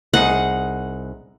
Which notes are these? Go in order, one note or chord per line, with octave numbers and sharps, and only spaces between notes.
C2 D#4 G#4 F#5